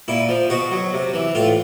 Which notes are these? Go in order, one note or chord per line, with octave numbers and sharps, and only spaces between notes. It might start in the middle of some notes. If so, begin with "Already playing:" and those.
A#2 E4
F3
B2 F#4
F#3
C3
E3
A2 F4